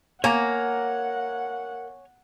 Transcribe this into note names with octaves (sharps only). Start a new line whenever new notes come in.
A#3 C#5 F#5 G#5 A#5